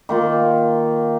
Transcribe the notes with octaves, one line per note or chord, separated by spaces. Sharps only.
D#3 A#3 F4